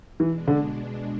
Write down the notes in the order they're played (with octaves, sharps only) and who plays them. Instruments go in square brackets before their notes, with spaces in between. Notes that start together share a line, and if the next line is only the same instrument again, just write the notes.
[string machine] B2 G#3 D4 [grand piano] E3
[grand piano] D3